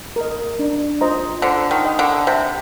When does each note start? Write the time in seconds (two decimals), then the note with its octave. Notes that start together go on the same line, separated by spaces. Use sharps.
0.16 A#4 D#5
0.59 D4
1.01 F4 C5 D#5 A#5
1.42 D3 C5
1.71 D#3
1.85 D#5 G5
1.99 D3
2.27 C3 C5